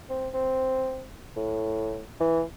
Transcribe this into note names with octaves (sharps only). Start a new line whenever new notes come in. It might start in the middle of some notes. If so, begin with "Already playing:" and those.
C4
C4
A2
E3